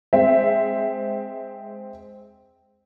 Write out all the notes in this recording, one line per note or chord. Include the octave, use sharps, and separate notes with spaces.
G#3 C4 E5